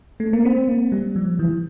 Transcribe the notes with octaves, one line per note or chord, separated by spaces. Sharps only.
A3
A#3
C4
A#3
G3
F3
E3